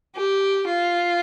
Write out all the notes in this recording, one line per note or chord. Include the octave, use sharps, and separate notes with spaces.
G4
F4